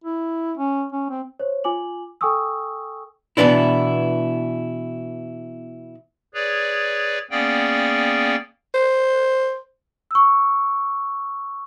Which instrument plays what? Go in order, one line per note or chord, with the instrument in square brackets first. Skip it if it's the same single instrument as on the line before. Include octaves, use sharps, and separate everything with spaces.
[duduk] E4
C#4
C#4
C4
[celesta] C5 C#5
F4 G#5 D6 F#7
A4 G5 G#5 C#6 D#6 E6
[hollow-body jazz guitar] B2 E3 B3 D4 E4
[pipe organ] G#4 B4 C#5 D5
A#3 B3 C#4 G#4 D5 G5
[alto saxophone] C5
[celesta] C#6 E6